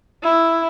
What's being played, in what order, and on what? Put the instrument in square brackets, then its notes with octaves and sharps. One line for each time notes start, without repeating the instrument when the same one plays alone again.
[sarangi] E4